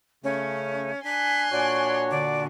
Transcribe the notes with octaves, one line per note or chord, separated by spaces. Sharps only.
C#3 A3 C#4
D4 G#5 C6 F#6 B6
A#2 D4 F#4 C#5 D5
D3 D5